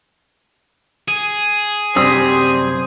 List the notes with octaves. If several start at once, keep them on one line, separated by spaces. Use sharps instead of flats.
G#4
F#2 C3 G3 C4 C5 D#6